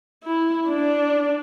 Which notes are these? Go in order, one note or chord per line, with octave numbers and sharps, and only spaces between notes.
E4
D4